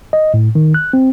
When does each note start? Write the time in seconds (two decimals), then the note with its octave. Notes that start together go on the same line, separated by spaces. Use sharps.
0.13 D#5
0.34 A2
0.55 D#3
0.74 F#6
0.93 C4